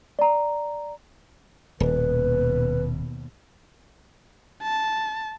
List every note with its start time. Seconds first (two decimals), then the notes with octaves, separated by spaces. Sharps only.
0.19 D5 A#5
1.80 D#1 D#2 B2 B4
4.63 A5